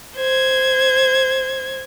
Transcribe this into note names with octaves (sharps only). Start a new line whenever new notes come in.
C5 G#6